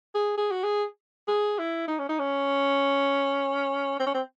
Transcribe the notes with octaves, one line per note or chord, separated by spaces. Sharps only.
G#4
G#4
F#4
G#4
G#4
E4
D#4
C#4
D#4
C#4
C4
C#4
C4